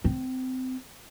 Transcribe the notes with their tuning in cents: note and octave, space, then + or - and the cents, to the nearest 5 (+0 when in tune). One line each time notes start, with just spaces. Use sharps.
C4 -25